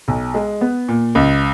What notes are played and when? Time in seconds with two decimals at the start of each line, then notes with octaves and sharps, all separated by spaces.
0.08 B1
0.34 G#3
0.61 B3
0.88 A#2
1.15 C#2